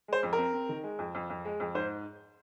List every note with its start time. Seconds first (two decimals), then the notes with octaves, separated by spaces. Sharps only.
0.08 G#3 C5
0.23 F2
0.33 A#4
0.38 C4
0.54 C4
0.69 D#3
0.84 G#3
0.99 F2
1.15 F2
1.30 F2
1.45 G#3
1.60 F2
1.75 G#2 C5